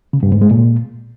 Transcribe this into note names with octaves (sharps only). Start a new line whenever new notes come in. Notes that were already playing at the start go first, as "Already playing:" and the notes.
C#3
G2
G#2
G#3
A#2